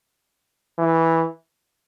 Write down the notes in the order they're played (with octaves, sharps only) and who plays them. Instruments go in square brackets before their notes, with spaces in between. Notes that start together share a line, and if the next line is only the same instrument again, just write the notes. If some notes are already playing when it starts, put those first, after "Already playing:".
[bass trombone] E3